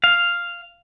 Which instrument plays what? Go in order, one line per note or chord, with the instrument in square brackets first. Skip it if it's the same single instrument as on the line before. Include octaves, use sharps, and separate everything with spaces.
[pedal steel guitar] F5